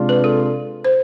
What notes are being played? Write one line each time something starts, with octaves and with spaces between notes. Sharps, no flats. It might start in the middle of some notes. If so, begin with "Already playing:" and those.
Already playing: C3 G#3 D4 F4
B4
A4
C5